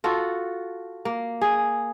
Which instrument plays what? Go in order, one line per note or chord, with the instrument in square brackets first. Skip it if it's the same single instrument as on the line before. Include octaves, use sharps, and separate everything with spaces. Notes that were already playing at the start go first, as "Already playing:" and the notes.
[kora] F4 F#4 A4 F#5
A#3
G#4